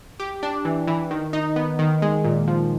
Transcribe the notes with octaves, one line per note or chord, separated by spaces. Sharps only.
G4
D4
E3
E3
D#3
D#4
B3
D#3
G#3
A#2
F3